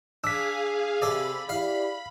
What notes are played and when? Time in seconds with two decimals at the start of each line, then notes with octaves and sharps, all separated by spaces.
0.24 D4 G#4 F5 E6 B6
1.02 C3 A4 D5 B5
1.49 E4 G4 D5 F5